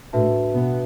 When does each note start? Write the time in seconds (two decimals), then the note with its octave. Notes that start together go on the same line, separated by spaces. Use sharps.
0.13 A2 A3 D4 F#4 B4 E5 A5
0.54 B2 B3